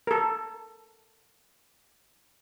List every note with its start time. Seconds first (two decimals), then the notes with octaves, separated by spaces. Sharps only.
0.07 A4 A#4